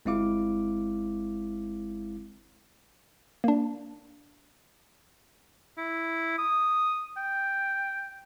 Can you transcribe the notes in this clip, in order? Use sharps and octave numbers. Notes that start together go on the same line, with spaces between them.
G1 G#3 C4 E4 F5 D6
A#3 D4
E4
D#6
G5